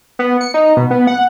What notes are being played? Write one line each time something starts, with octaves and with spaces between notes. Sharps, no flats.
B3
C#7
D#4
B2
B3
F#5